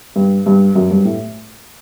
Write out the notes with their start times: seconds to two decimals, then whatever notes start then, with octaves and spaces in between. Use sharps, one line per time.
0.16 G2
0.46 G2
0.75 F#2
0.91 G2
1.05 A2